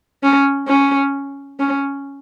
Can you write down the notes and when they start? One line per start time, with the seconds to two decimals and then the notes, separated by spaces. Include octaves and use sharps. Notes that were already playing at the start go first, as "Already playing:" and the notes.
0.23 C#4
0.68 C#4
1.60 C#4